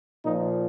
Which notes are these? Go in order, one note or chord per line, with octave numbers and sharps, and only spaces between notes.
A#2 F3 D#4